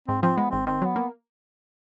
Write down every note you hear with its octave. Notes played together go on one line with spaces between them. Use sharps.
G#2 C4
F3 C4
G#3 B3
G#1 C4
D#3 C4
F#3 B3
A#3